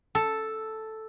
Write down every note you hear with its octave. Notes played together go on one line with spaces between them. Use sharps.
A4